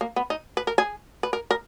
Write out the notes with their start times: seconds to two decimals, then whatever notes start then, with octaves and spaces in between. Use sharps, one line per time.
0.01 A#3
0.16 B3
0.30 D#4
0.57 B4
0.67 A#4
0.78 G#4
1.23 B4
1.33 A#4
1.51 A#4